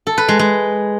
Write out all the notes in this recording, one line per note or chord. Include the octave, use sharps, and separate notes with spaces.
A4
B4
G#3
G#3